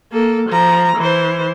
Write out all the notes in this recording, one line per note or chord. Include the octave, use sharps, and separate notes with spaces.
A#3 A4
F3 A#5
E3 C5